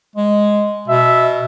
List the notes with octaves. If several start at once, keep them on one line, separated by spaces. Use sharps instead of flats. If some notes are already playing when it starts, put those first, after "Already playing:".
G#3
B2 E5